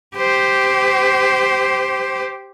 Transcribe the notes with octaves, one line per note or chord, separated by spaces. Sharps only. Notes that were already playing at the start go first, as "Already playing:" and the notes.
G4 C5